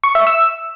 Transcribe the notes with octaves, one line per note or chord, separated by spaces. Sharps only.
C#6
E5
E6